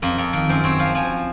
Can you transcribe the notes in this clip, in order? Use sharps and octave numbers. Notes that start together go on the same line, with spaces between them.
F2 A#4
F2
D#3
F#2 C5
C4 C#5
F3 F5
F3 G#5